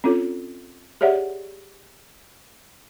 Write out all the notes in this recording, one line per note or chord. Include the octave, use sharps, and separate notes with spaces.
C4 C#4 E4 F4 A4 C#5
G4 G#4 C#5 D5 E5 F#5